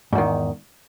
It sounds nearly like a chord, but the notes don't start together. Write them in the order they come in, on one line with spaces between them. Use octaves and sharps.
G#2 E2 D#3